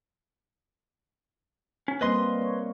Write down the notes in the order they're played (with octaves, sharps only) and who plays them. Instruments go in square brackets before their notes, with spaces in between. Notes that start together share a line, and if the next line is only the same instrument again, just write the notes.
[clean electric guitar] C#4
[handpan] G3 A#3 C4 [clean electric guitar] B4 D#5 C6
[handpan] C#5